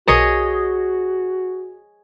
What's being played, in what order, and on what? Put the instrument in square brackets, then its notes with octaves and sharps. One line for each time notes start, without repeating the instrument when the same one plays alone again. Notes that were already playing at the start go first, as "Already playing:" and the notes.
[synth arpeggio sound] B1 A#4 [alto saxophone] F#4 [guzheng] G#4 C#5 D#5